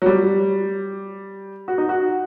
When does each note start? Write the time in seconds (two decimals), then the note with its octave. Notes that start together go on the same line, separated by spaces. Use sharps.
0.02 F#3
0.06 G3
1.68 F#4
1.78 D#4
1.89 F#4